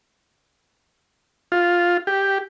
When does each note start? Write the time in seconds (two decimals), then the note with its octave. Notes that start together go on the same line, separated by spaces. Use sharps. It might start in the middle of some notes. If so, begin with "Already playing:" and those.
1.52 F4
2.07 G4